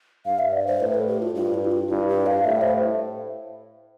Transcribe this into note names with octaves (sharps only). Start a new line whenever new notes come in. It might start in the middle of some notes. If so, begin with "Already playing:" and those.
G2 F5
E5
D5
C5
A2 B4
A4
G4
F4
G2 F4
E4
G4
F4
G2 E4
G4
F5
A2 E5
C5